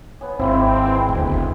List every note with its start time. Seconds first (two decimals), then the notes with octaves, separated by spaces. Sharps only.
0.21 B3 G#4 C#5
0.39 G#1 G#3 A#3 C4 E4 G5
0.86 E3 E4
1.09 E1 D2
1.25 F#1 B3